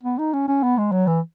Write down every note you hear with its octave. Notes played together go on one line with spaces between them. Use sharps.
B3
D#4
C#4
C#4
B3
G#3
F#3
E3